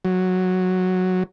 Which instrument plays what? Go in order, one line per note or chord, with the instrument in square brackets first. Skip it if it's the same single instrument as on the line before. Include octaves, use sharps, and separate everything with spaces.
[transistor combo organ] F#3